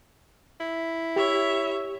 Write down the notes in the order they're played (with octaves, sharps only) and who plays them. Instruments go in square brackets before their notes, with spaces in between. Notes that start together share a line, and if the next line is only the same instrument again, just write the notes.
[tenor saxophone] E4
[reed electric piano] G4 [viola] C#5 E5